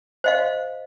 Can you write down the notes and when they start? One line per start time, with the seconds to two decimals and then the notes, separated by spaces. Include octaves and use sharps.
0.24 C5 D#5 F5